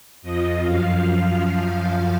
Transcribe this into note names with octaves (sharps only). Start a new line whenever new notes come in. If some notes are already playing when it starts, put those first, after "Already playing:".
F2 F3 D#5
F#2 F3 F5